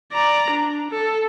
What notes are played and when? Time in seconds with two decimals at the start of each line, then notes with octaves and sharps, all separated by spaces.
0.13 D5 A#5
0.50 D4
0.91 A4